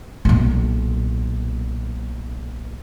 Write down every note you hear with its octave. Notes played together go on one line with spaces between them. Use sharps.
B1 A#2